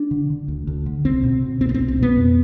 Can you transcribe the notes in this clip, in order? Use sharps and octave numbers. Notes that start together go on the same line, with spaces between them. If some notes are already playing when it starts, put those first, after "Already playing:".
Already playing: D4
D3
D3
D2
D2
D3
C2 C4
B2
B2
C2 C4
B3
C4
C2
C4
B2 B3
F2